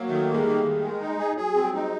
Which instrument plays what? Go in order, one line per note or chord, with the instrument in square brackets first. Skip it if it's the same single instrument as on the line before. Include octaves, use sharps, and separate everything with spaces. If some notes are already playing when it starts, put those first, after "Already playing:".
Already playing: [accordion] F#3 [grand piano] A#3
[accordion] D#3 [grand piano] A3
[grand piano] G3 [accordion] A#3
[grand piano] G#3
[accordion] D#3 [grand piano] G3
[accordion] D#3
G#3
D#4
G#4
[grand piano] F#3 [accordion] G#4
[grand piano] G3 [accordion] C4
[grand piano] G#3 [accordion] D#4